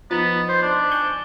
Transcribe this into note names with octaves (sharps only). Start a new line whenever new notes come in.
F3 B3 D#4 A6
C5
D4
G#5 C#6 G6